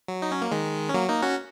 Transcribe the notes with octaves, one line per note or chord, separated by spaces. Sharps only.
F#3
D#4
C#4
A#3
D#3 G#3
C#4
F#3 A#3
A#3 D#4
C#4 F#4